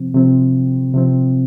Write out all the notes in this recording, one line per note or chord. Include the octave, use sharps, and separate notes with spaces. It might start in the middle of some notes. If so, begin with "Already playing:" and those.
Already playing: C3 F3 C4
C3 F3 C4
C3 F3 C4